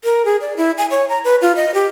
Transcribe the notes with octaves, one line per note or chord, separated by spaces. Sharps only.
A#4
G#4
D5
E4
G#5
C#5
A#5
B4
F4
D#5
G4